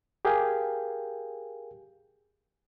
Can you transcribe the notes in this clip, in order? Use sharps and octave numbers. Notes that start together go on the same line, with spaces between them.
G4 G#4 A#4 F5 G5 G#5